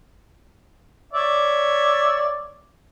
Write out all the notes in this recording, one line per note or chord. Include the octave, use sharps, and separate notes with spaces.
C#5 D5 E5